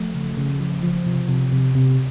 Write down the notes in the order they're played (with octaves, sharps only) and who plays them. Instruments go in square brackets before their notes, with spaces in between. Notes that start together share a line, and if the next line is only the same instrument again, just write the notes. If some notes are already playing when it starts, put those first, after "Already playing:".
Already playing: [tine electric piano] F3 A3
C#3
C#3
F3
F3
C3
C3
C3
C3